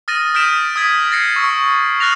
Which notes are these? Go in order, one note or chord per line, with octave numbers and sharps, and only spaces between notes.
D#6 F6 A6 A#6 D#7
D#6 F6 G6 B6 D7 E7
D#6 E6 G#6 B6
G6 A6 A#6 C7 C#7
C#6 E6 A#6
D#6 F6 F#6 A6 A#6 F7